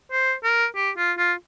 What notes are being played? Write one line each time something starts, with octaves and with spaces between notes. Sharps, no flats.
C5
A#4
G4
F4
F4